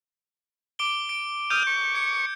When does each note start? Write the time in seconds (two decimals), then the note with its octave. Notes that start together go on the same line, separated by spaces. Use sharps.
0.79 D6 D7 G7
1.09 D7
1.50 D#6 F6 G6
1.67 C#6
1.94 G#6 C#7